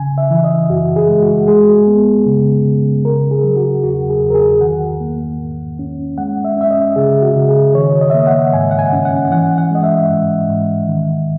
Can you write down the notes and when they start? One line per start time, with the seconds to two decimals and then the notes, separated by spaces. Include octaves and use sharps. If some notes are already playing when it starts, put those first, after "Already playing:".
Already playing: C#3 G#5
0.18 E5
0.30 E3
0.44 D#5
0.70 F#2 F#4
0.96 G#4
1.09 G#3
1.22 F#4
1.48 G#3 G#4
1.87 B3
2.26 C#3
2.65 C#3
3.05 C#3 A#4
3.31 G#4
3.43 F#3
3.56 F#4
3.83 E2 F#4
4.10 G#4
4.22 E2
4.30 A#4
4.35 G#4
4.61 D#3 F#5
5.00 A#3
5.40 G#2
5.79 C#4
6.18 G#3 F#5
6.45 E5
6.57 C#4 E5
6.71 D#5
6.96 C#3 G#4
7.22 F#4
7.35 C#3
7.49 G#4
7.75 D#3 C#5
8.01 D#5
8.10 E5
8.14 A#3 D#5
8.27 F#5
8.53 G#2 G#5
8.71 F#5
8.79 G#5
8.93 C#4
9.05 F#5
9.32 E3 F#5
9.58 F#5
9.71 G#3 D#5
9.84 E5
10.10 G#2
10.49 G#2
10.88 D#3